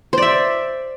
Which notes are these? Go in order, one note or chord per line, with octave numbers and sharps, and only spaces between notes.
C5 D5 E5